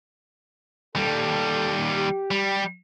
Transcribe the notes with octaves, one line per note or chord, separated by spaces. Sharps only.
D#2 G3 A4
G4
G3